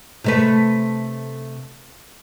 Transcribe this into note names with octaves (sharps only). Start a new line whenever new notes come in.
C3 A3 B4